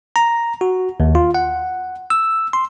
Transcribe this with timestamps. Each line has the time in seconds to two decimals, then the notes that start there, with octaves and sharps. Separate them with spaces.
0.16 A#5
0.61 F#4
1.00 D#2
1.15 F4
1.34 F#5
2.10 E6
2.53 C6